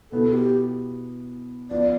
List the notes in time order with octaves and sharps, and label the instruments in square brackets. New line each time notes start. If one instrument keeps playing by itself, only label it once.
[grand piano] B2 B3 E4 [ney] A4
[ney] G4
[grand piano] F3 B3 F4 [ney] D5